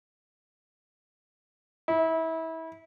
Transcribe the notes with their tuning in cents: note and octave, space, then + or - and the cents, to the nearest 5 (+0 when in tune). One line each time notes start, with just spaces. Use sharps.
E4 -30